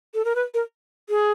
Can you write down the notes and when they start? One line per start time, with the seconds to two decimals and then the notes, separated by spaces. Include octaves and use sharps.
0.14 A4
0.25 A#4
0.35 B4
0.54 A#4
1.09 G#4